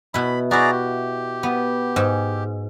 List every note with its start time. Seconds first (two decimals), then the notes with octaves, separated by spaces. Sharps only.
0.14 B2 E4 B5
0.51 E4 F#4 G#4 D5 A#5
0.72 G4
1.43 B3
1.96 G#2